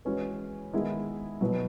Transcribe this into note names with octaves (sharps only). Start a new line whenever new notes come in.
E3 G#3 C#4 F#4 B4
D#3 G#3 B3 E4 G#4
B2 F#3 B3 E4 B4